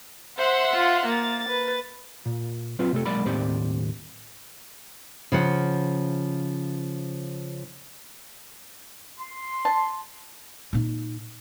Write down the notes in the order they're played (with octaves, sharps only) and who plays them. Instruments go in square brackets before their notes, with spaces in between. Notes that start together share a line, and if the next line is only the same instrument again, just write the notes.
[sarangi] C5 [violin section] E5 F#5 C6
[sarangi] F4
[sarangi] A#3 [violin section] A6
[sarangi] B4
[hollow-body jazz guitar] A#2
F#3 C4 F4 B4
C3 A3 A4
B1 F#3 G#3 A#3 D5 B5
D#2 A2 C4 G4 C5 D5
[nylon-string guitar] C#3 F3 F#5
[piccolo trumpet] C6
[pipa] A5
[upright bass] A#2 D#4